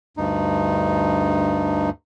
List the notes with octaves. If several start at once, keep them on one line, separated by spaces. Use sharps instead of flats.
D2 G2 D#4